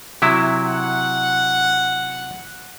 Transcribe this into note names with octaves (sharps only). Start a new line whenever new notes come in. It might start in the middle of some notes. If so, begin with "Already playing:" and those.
C3 F#3 E4
F#5